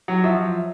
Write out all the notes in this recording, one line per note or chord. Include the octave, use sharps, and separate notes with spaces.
F#3
F3 E5